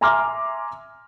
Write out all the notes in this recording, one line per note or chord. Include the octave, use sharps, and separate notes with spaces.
E5 G#5 A#5 C6 D6 F6